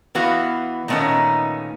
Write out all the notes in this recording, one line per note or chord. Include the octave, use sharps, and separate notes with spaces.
E3 B3 F#4 F5
A#2 D#3 A3 B3 C#4 D#4